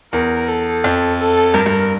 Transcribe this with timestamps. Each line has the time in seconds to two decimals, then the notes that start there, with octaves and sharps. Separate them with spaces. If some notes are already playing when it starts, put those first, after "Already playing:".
0.13 E2 A#4
0.48 A4
0.84 F2
1.19 A4
1.54 G2 A#4
1.66 G2